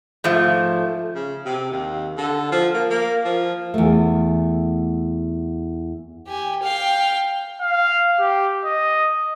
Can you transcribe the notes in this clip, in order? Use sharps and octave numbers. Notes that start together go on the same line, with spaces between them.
G#2 F3 A3
C#3
C3
D#2
D3
F3
A#3
A#3
F3
E2 A3
G4 G#5
F5 G5
F5
G4
D#5